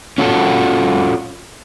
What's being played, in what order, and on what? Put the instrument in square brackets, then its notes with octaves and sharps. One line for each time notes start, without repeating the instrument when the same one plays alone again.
[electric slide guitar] C#4 F4 F#4 A4